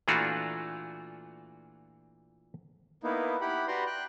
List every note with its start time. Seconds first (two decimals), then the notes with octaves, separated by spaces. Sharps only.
0.08 A#2 E3 A3 D4 F4 F#4
3.03 A#3 B3 D#4 E4
3.41 E4 G4 F#5 B5
3.68 F#4 G4 B4 D5 A#5 C6
3.86 G5 F#6